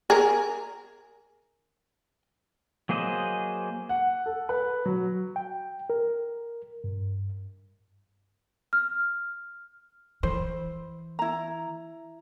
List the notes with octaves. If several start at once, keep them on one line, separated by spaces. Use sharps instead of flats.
G#4 A#4
F#3 A#3 G#4 C5 D#5
F#5
A4
B4
F#3
G5
A#4
G2
F6
E3 C5
E4 A#5